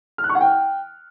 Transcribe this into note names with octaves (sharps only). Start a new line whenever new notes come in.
F6
F#6
C#6
F#5
G5